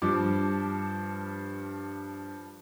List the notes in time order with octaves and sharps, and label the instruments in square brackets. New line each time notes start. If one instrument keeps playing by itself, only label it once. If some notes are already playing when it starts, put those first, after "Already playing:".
[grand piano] G2 F3 D6